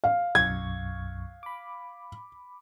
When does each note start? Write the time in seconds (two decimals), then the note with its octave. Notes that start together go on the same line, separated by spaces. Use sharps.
0.04 F5
0.35 B1 F#2 C#6 G#6
1.43 B5 D6